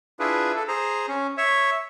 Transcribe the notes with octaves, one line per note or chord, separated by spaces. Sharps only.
D4 E4 F4 G#4 B4
A4
G#4 C5 A#5
C#4
C#5 E5